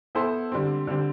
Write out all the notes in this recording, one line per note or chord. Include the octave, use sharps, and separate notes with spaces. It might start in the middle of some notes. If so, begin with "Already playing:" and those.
B3 E4 A4 C5
D3 G3 C4
D3 G3 C4